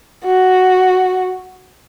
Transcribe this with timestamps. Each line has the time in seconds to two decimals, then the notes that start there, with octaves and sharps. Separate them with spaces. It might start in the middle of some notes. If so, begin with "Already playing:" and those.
0.25 F#4